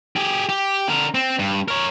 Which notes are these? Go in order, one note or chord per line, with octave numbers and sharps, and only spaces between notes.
G4 G#4
G4
D3 A#4
C4
G2
A#4 C#5